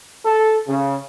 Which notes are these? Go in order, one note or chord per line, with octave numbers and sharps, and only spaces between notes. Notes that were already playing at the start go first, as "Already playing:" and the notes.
A4
C#3